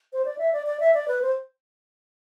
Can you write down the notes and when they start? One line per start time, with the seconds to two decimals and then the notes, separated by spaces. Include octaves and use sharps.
0.13 C5
0.25 D5
0.38 E5
0.53 D5
0.66 D5
0.80 E5
0.94 D5
1.08 B4
1.22 C5